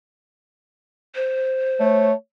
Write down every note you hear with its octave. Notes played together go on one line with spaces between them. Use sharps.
C5
A3 C#5